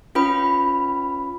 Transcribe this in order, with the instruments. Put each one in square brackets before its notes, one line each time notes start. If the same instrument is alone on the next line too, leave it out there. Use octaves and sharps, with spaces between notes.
[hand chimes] C#4 F4 B4 B5